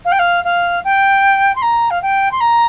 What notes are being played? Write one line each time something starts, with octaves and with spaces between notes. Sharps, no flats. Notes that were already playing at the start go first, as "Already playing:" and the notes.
F5
G5
F5
F5
G5
C6
A#5
F5
G5
C6
A#5